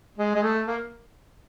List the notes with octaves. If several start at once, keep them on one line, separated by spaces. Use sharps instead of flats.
G#3
G#3
A3
A#3